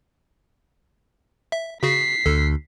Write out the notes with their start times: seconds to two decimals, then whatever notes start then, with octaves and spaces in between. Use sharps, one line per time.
1.52 E5
1.83 C#3 F#4 G#4 B6 C7
2.26 D2 A4